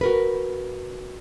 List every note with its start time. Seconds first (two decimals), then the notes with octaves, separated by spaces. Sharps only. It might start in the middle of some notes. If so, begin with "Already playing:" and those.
0.01 F#4 A#4 B4